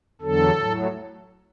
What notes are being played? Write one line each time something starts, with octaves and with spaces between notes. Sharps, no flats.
E2 D3 F#3 A4
A2 F#3